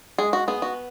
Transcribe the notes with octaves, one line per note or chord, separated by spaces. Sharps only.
G#3 G#4
F#4
B3 G#4
F#4